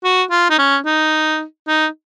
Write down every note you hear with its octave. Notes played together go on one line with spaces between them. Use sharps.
F#4
F4
D#4
C#4
D#4
D#4